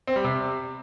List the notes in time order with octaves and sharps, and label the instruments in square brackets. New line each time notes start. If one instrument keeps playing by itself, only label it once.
[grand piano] C4
G3
C3